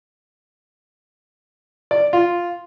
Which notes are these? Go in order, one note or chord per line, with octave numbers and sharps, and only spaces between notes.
D5
F4